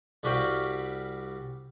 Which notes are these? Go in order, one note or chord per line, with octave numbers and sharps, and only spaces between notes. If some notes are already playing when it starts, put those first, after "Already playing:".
C2 G3 F#4 B4 F5 G5